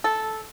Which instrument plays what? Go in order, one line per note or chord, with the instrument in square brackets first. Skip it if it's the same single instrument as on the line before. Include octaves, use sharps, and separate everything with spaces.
[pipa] A4